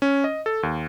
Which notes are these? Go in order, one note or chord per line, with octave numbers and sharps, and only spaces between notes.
C#4
D#5
A4
D#2